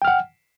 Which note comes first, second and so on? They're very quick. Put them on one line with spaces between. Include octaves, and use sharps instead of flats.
G5 F6 F#5